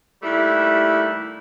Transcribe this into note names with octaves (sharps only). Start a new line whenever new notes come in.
D#2 G3 A3 E4